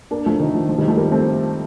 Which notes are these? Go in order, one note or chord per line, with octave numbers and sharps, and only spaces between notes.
A#3 D4
F3 A3
D#3
F3
F3
D#3 G3
F3 A3
G3 A#3
A3 C4